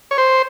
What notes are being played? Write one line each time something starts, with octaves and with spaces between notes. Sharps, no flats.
C#5
C5